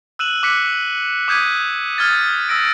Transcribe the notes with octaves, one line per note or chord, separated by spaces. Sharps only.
E6 F#6 D#7 E7 F#7
D6 F#6 B6 C#7
D6 D#6 G6 G#6 B6 D#7
D#6 F6 G#6 A6
D#6 E6 A#6 D7